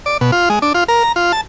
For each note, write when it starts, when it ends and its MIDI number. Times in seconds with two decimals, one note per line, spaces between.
0.06 0.17 74
0.21 0.31 47
0.32 0.49 65
0.50 0.59 56
0.62 0.73 62
0.75 0.84 65
0.88 1.03 70
1.03 1.12 82
1.16 1.32 65
1.32 1.41 81